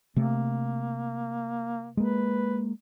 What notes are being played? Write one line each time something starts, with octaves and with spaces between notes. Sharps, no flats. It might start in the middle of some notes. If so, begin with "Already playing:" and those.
C3 A3 A#3
G#3 A#3 B4